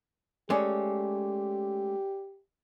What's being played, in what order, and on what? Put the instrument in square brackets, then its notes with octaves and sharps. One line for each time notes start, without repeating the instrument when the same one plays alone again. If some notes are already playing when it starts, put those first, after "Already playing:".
[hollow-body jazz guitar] G#3 A3 C#4 [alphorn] G4 [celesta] D5 G#5 D6